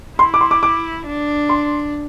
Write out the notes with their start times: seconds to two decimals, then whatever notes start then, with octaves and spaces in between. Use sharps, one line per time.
0.19 E4 C6
0.34 D6
0.41 C6
0.51 D6
0.63 D6
1.06 D4
1.49 C6